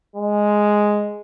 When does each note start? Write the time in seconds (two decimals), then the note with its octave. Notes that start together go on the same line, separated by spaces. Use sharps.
0.16 G#3